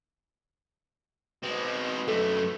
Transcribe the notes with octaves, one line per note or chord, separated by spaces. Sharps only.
B2 G#3 C4
F#2 A3 A4